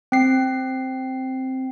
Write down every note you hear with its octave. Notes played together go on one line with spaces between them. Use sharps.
C4 C7